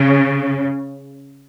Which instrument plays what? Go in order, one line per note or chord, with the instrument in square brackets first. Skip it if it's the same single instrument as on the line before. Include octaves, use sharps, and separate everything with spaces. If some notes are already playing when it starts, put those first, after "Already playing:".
Already playing: [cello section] C#3